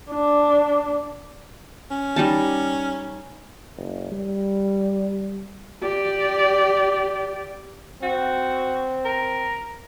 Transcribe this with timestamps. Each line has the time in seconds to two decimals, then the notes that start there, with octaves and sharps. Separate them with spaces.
0.11 D4
1.91 C#4
2.16 G3 D#4 A5
3.77 F#1
4.12 G3
5.83 G4 D5
8.03 C4 F#4
9.05 A#4